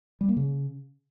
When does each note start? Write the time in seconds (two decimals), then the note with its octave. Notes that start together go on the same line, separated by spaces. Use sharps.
0.21 G3
0.29 A#3
0.37 C#3